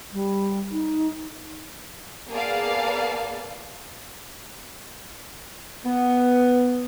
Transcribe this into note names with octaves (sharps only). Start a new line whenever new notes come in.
G3
D#4
A#3 B3 G#4 D5 F5 A5
B3